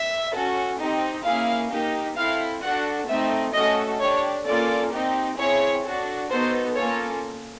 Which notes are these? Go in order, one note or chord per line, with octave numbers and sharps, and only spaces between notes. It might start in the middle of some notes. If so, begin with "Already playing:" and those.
Already playing: E5
C#4 F#4 A4
C4 D#4 G4
A#3 C#4 E4 G#4 F5
A#3 D#4 G4
C4 E4 A4 F5
D4 F#4 A4 F#5
A3 C4 D#4 E5
A3 C#4 F#4 A4 D#5
D4 G4 C#5
A#3 C#4 F4 A4 D5
C4 D#4 G4
C4 E4 G#4 C#5
D4 F#4 A4
B3 D#4 F#4 A4 C5
A#3 C#4 F4 A4 C#5